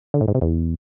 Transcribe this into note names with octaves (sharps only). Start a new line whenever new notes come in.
D3
A2
G#2
C3
E2